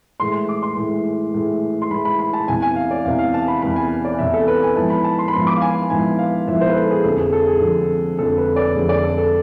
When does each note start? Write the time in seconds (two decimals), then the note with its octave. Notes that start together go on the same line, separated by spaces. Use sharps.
0.20 A2 E3 G#3 C6
0.49 D6
0.62 C6
0.77 A2 E3 G#3
1.34 A2 E3 G#3
1.82 C6
1.91 A2 E3 G#3 B5
2.05 B5
2.19 B5
2.33 A5
2.48 E2 C3 E3 G#5
2.62 G#5
2.76 F5
2.91 D5
3.05 E2 C3 E3 F5
3.19 F5
3.34 A5
3.48 B5
3.62 E2 C3 E3 B5
3.76 G#5
4.05 D5
4.19 E2 C3 E3 E5
4.34 A4
4.48 B4
4.62 G#5
4.76 G#2 F3 B3 E4 A5
4.90 B5
5.04 A5
5.19 C6
5.28 B5
5.33 G#2 F3 B3 E4 C6
5.47 D6
5.57 F5
5.62 G#5
5.75 G#5
5.90 G#2 F3 B3 E4 G#5
6.19 F5
6.47 G#2 F3 B3 E4 E5
6.61 C5
6.69 B4
6.76 A4
6.90 G#4
7.04 F1 F2 D3 A4
7.19 G#4
7.33 A4
7.47 G#4
7.61 F1 F2 D3
8.19 F1 F2 D3 A4
8.38 B4
8.56 D5
8.75 F1 F2 D3 G#4
8.89 D5
9.03 A4
9.18 A4